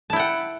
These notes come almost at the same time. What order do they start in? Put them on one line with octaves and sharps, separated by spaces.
A5 E4 G5 F#5